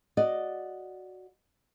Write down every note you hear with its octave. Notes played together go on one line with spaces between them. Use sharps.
F#4 D5 D#5